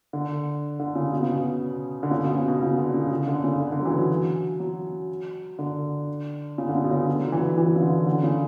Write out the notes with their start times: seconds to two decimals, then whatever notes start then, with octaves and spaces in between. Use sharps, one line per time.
0.13 D3
0.79 D3
0.95 C#3
1.12 B2
1.22 C#3
1.32 B2
2.03 D3
2.11 C#3
2.23 B2
2.36 C#3
2.48 B2
2.62 C#3
2.77 D3
2.94 C#3
3.11 C#3
3.28 D3
3.44 C#3
3.60 D3
3.72 D3
3.81 F#3
3.86 E3
3.97 F#3
4.60 F#3
5.59 D3
6.58 C#3
6.69 D3
6.75 C#3
6.84 B2
6.91 C#3
7.07 D3
7.20 F#3
7.32 E3
7.58 E3
7.76 C#3
7.81 D3
8.06 D3
8.23 C#3